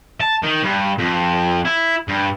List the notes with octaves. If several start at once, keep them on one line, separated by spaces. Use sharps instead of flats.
A5
D#3
G2
F2
E4
G2